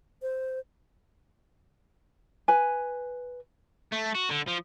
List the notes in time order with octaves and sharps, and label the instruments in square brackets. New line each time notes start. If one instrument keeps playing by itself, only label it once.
[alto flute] C5
[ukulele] B4 G#5
[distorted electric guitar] A3
F#4
D3
F3